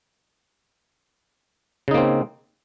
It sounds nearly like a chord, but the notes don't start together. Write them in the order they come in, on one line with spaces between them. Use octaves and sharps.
C#3 D#4 A#3 C4